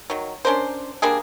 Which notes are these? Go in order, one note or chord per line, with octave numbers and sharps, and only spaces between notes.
D#3 F#3
C#4 D4 A#4 C5
G3 A#3 D4 G#4